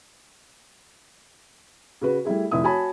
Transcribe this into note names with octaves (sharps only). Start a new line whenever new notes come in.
C#3 F#4 B4
G3 A3 E4 G#4
F1 E4 D#6
F#4 C#5 G#5 A5 B5